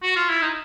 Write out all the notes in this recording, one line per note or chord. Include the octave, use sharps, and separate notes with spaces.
F#4
F4
E4
D#4